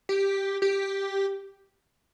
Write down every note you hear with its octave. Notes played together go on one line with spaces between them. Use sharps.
G4
G4